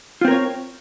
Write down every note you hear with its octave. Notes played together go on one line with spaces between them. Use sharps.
C4 F4 A#4 C#5